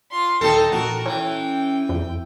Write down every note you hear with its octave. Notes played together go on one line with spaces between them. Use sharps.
F4 C6
D#1 D#4 A4 G5 A5
A#1 F#4 A#4
E3 C#4 G5
F2